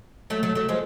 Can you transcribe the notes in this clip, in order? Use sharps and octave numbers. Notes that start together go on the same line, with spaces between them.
F#3 A3
F#3 A3
F#3 A3
F3 G#3